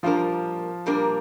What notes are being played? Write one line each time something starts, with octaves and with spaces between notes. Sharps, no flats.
A#2 F3 G3 A#3 D4 F4 A#4
A#2 G3 A#3 D4 A#4